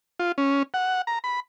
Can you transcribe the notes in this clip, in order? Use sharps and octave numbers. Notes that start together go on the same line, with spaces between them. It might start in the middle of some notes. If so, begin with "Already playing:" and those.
F4
C#4
F#5
A#5
B5